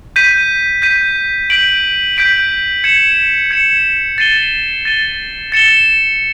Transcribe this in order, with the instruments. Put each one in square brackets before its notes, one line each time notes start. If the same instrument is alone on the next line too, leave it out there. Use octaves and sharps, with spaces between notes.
[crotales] G6 B6 D#7
G6 B6 D#7
G6 B6 D7 F#7
G6 B6 D7 F#7
G#6 C#7 E7
G#6 C#7 E7
A6 C7 D#7 G7
A6 C7 D#7 G7
A6 C#7 E7 G7